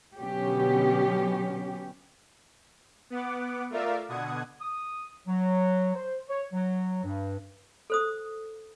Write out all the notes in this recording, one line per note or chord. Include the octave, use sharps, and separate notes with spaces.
B2 D3 F#3 B3 C#4 G4
B3 F#5 D6
A3 F4 A#4 D5 E5 F5
B2 D3 F#5 D#6 G#6
D#6
F#3
C5
C#5
F#3
G2
A4 C5 D#6